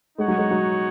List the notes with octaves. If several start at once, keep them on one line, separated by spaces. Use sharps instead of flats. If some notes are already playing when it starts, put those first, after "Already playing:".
G#3 D#4 F#4 C#5 F#5
F#3
G#3
F#3